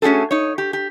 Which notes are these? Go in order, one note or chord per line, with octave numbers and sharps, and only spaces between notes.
A3 C#4 F#4 G#4 A4
D#4 C#5
G4
G4